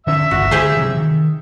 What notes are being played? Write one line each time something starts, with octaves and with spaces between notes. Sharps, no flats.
D3 C#4 E5 E6
D1 G1 C2 F#4
D3 G4 G#4 C5
C3 E3 F#3
D#3